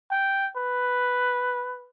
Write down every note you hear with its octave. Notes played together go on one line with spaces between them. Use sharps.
G5
B4